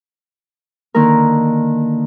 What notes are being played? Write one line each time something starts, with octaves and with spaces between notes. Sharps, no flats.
D3 D#3 A#3 D#4 A#4